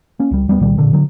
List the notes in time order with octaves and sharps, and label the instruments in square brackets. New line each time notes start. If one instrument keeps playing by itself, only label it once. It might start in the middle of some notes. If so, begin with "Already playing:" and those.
[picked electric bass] A#3 C#4
C#2 G3
D#2 G3 G#3 B3
C2 A#2 D#3 G3
A1 A#2 D3
D3 F#3